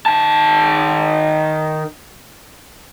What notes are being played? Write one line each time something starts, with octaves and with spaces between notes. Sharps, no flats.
D#3 A5